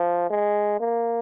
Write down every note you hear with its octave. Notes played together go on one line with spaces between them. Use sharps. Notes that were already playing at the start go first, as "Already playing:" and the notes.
Already playing: F3
G#3
A#3